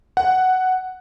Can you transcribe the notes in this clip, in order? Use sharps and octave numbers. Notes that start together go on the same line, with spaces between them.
F#5